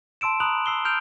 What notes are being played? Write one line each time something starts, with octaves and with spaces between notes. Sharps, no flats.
A5 C6 E6 D7 E7
A#5 B5 D#6 F#6 F7 F#7
E6 C7 G7
F6 G6 D7 F7